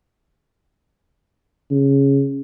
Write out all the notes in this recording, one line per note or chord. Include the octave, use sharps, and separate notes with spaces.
C#3